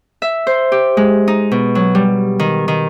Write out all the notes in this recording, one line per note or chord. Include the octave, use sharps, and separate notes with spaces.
E5
C5
G4
G#3
D#4
B2
F#3
G3
D#3
D#3